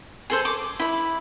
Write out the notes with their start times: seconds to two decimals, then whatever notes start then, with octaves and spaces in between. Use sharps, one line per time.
0.30 G#4 A4 C5
0.45 D6
0.80 E4 B5